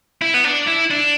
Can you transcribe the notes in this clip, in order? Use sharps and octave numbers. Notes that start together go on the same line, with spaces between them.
E4
B3
D4
E4
D4